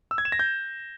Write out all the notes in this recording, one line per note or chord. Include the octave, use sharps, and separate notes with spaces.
E6
G#6
E7
A#6
G6